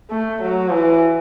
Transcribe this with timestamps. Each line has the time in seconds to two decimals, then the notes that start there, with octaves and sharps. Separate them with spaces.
0.10 A3
0.42 F#3
0.72 E3